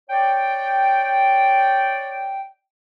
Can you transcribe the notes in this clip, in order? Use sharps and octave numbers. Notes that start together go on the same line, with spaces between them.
C#5 D5 G5